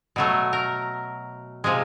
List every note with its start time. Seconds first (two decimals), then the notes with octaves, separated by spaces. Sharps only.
0.16 B2 F#3 A3
0.53 A#4
1.64 C3 F3 G#3